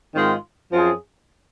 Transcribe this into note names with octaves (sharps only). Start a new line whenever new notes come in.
G#2 D#3 G#3 C4 F4
F#2 F3 C4 F4 G#4